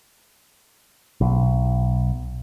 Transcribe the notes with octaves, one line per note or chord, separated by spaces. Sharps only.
B1